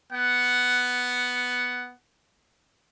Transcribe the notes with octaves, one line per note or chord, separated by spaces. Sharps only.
B3 F#5